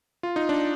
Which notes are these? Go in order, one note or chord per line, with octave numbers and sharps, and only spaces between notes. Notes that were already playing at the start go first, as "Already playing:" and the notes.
F4
D#4
D4